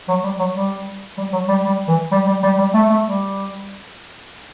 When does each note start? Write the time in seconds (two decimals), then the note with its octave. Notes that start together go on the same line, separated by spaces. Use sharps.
0.08 F#3
0.24 G3
0.39 F#3
0.56 G3
1.17 G3
1.33 F#3
1.49 G3
1.65 G3
1.88 E3
2.12 G3
2.27 G3
2.43 G3
2.59 G3
2.74 A3
2.90 A3
3.06 G3